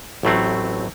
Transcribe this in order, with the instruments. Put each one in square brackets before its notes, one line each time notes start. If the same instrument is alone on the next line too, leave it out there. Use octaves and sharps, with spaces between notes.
[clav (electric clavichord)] A1 A2 F#3 A3 C4